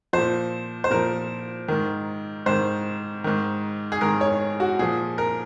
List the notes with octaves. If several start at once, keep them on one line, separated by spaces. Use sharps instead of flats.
A#2 F3 C5
C5
A#2 F3 A#4
G#2 D#3
G#2 D#3 C5
G#2 D#3
G#4
G#2 D#3 A#4
C#5
F#4
A#2 F3 G#4
A#4